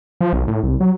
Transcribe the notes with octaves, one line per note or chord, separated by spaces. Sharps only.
F3
B1
A2
C2
F#3